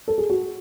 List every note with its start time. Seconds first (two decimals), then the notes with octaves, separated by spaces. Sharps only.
0.08 A4
0.18 G#4
0.30 F#4